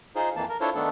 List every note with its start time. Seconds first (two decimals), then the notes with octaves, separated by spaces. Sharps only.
0.16 D#4 F4 G#4 C5
0.36 F2 E3 A#3 A5
0.49 A#4
0.61 D4 E4 F4 A4 C5 C#5
0.75 D#3 A3 B3 D4 A4